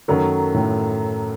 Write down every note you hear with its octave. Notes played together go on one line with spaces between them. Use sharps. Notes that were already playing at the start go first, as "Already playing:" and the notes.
F#2 D#3 F#3 A3
A2